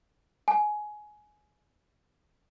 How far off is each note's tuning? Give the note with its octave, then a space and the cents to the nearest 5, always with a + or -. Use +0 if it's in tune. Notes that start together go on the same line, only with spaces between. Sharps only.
G#5 +15